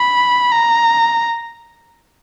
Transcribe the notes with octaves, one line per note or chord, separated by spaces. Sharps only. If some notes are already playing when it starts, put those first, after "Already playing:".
Already playing: B5
A#5